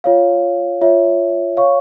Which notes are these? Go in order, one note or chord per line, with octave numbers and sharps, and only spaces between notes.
F4 C#5 F5
F4 C#5 E5
C#5 F5 C#6